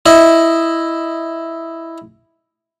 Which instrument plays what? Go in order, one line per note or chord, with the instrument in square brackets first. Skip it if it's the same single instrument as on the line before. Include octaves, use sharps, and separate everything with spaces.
[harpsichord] E4 D#5